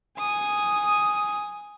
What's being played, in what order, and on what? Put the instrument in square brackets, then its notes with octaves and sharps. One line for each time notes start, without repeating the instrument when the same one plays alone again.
[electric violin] G#5 D#6